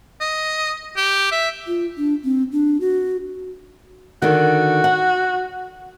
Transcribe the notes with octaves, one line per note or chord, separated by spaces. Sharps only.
D#5
G4
E5
F4
D4
C4
D4
F#4
D3 D#3 F#4
F#5